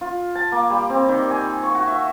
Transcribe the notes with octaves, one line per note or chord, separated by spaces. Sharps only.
F4
A5
A#3
G3
C4
D#3
G#5
C#6
F#4
E5